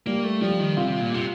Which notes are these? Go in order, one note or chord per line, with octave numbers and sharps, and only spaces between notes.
G3 A#3
A3
F3 G3
D#3
C3 F4
A#2
C3 F4